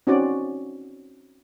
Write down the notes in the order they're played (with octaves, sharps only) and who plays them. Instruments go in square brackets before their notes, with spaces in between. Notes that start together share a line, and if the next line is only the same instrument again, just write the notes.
[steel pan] C4 C#4 D#4 F#4 C#5 D5